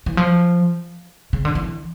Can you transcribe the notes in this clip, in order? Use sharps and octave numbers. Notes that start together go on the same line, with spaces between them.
E3
F3
C#3
D3
E3